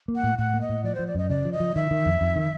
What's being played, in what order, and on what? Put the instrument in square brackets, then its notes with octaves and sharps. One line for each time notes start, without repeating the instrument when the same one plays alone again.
[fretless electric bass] A#3
[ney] F#5
[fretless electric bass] A2
[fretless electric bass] A2 [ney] F#5
[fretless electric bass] A#3
[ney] D#5
[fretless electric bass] A2
[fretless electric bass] F3 [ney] D5
[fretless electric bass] F3 [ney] C5
[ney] D5
[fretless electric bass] F#2 [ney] D#5
[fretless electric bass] C#3 [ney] D5
[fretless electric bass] F3
[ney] D#5
[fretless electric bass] F3
[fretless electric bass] D#3 [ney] E5
[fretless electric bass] D#3
F2
F2
D#3